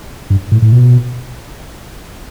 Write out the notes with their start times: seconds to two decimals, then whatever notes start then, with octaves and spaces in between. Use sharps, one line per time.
0.30 G2
0.52 A2
0.62 A2
0.72 B2